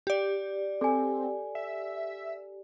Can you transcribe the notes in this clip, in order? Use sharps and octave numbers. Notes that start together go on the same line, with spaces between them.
G4 D5
C4 A4 G#5
E5